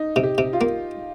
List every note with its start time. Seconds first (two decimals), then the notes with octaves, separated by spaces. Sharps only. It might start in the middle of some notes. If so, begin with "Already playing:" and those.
Already playing: D#4
0.16 C3
0.23 G4
0.38 C3
0.53 F4
0.61 A#3